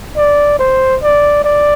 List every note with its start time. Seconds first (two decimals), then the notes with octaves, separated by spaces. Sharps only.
0.17 D5
0.59 C5
1.03 D5
1.44 D5